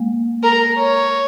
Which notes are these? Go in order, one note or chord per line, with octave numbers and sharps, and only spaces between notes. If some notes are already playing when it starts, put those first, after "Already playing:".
Already playing: G#3 A#3
A#4
C#5